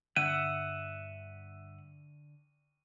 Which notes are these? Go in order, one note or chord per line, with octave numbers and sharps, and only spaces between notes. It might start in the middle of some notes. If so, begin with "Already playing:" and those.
G2 D3 E5 F#5 D#7